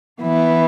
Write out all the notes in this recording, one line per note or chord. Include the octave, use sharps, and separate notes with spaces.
E3 B3 E4